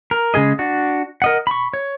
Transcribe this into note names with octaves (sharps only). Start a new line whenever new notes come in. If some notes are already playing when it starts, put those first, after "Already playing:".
A#4
C#3 G#3 G#4 D#5
D4 F#4
A#4 D#5 F#5
B5 C#6
C#5